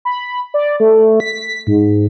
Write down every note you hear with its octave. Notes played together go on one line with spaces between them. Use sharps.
B5
D5
A3
B6
G#2